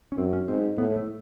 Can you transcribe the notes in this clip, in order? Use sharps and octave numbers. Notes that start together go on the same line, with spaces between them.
C#4
F#2 C4
C#4
G#2 C4
A2 B3
A3